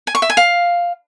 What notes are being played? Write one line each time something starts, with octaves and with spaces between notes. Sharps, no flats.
G#5
C#6
E5
G#5
F5